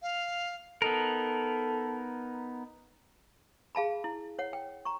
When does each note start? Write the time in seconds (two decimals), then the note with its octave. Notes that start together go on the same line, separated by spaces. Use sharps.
0.02 F5
0.82 B3 D#4 A4 A#4
3.75 G#4 F5 A5 B5
4.04 E4
4.39 C#5 F#5
4.53 G5
4.85 A#5 C#6